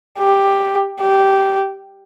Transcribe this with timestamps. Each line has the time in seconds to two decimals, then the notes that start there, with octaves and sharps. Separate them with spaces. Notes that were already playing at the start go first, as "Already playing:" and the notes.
0.19 G4
1.00 G4